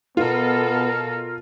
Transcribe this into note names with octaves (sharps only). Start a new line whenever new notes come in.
B2 B3 F4 A4 A#4